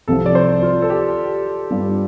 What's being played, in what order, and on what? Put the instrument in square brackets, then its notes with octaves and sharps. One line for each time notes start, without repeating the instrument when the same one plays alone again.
[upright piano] C2 C3 F3 [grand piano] A4
[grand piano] D5
C5
F4
A4
G4
[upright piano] G2 G3 D4 F4